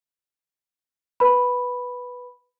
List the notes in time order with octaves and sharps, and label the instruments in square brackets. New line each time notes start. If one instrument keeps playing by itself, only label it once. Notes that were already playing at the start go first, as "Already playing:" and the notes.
[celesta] B4 B5